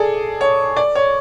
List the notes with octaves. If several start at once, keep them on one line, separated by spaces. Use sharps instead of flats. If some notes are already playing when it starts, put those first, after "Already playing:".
Already playing: G#4 A4 D5
C#5
D5
C#5